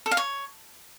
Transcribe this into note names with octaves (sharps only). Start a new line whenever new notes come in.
A4
F5
C#5